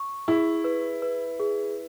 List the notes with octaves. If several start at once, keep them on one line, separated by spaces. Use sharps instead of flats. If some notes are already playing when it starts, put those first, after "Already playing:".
Already playing: C#6
E4 G#4
B4
B4
G#4